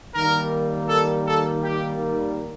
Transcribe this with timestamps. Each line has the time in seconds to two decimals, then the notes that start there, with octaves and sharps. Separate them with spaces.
0.15 D#3 G3 A#3 A#4
0.89 A4
1.27 A4
1.63 G4